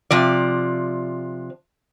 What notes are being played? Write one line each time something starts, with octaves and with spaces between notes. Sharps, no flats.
C3 F3 D5